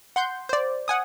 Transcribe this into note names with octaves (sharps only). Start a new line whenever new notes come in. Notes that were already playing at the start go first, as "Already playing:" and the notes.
F#5 C6 G6
C5 D5
F#5 G#5 D#6